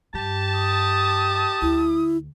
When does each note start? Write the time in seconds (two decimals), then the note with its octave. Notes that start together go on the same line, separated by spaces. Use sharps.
0.14 G2 G4 A5
0.59 D#6
1.62 D2 E4